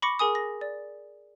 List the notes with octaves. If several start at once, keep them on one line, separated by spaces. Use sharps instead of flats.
B5 C#6 D6 A#6 C#7
G#4 A#4 G#5 D#6
A#6
D5